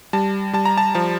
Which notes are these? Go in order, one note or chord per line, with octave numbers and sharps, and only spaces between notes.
G3 A5
G3 A5
A#5
A5
F3 A5